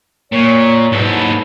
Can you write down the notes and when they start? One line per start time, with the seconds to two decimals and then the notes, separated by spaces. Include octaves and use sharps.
0.32 A#2 C#5
0.92 E2 G#2 B2 A4
1.09 B2 F#3 E4